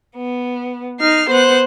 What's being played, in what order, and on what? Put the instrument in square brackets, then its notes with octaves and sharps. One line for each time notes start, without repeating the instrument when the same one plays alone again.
[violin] B3
[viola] D#4 [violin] F6 C7
[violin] B3 F#6 [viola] C5